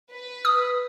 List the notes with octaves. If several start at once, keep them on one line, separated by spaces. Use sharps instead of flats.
B4
D#6